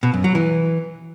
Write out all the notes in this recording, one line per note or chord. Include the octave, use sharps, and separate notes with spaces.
B2
F#2
F#3
E3